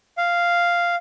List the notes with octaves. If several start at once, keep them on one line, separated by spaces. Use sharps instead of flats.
F5